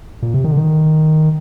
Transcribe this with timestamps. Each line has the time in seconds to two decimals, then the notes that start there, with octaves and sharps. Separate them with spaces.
0.22 A#2
0.34 C3
0.44 D#3
0.51 D3
0.57 D#3